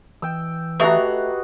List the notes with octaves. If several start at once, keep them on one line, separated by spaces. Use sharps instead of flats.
E3 G5 E6
A3 F#4 G4 B4 D#5 A#5